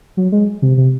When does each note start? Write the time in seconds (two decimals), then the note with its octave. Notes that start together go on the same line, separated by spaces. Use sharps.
0.17 F#3
0.32 G#3
0.62 C3
0.77 C3